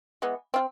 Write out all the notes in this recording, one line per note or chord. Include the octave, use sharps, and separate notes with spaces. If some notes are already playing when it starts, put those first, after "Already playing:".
E3 G#3 B3
C4 F4